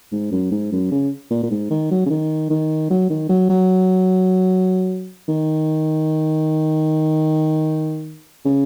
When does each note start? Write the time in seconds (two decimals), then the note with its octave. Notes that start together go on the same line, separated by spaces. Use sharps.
0.12 G#2
0.32 F#2
0.52 G#2
0.72 F#2
0.91 C#3
1.31 A#2
1.43 A#2
1.51 G#2
1.70 D#3
1.91 F#3
2.06 C#3
2.10 D#3
2.50 D#3
2.91 F#3
3.10 D#3
3.29 F#3
3.49 F#3
5.28 D#3
8.45 C#3